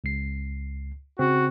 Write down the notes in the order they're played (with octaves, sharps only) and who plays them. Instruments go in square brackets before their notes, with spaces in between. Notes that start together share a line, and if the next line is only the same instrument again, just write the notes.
[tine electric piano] C#2 C7
[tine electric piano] C#3 C4 [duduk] F#4